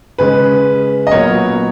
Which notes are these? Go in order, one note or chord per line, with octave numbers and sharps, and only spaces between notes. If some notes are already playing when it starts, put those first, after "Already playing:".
C#3 G#3 C#4 B4
D#5
A#2 F#3 B3 A#4 C#5